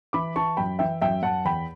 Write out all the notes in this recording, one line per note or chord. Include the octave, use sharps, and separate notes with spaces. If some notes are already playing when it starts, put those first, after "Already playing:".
E3 B5 D6
E3 A5 C#6
F#2 G5 B5
E3 E5 G5
F#2 E5 G5
F#2 F#5 A5
E2 G5 B5